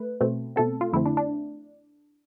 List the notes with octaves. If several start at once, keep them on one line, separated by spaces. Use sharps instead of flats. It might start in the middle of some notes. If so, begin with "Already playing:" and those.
Already playing: A3 B4
B2 A3 C4
B2 A3 C4 A4
F4
F2 D3 A3 C4 E4
D4
D4